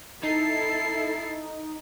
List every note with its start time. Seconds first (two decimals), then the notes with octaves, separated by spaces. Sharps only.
0.23 D#4 E4 A4 C7